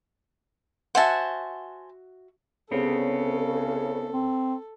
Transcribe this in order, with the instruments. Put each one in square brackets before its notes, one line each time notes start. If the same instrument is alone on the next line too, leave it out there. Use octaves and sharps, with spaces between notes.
[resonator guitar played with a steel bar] F#4 E5 F#5 [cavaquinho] C5 G#5 A5
[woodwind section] C2 C#3 [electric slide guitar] B3 C4 [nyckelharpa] A4
[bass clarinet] C4